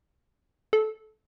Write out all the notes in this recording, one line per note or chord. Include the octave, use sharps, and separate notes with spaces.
A4